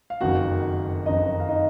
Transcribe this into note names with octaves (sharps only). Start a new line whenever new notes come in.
F5
F#1 F2 D#3 F#4 F#5
F#1 F2 D#3 D#4 D#5
F5
D#4 D#5